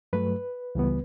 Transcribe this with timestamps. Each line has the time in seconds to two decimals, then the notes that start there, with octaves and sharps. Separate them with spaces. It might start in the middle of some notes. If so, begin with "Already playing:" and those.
0.13 G2 F#3 A3 B4
0.75 C#2 C#3 E3 G3 B3